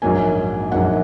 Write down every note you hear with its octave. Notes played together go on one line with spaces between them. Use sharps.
A#1 G#2 F#3 A#3 G#5
A#1 G#2 F#3 A#3 F#5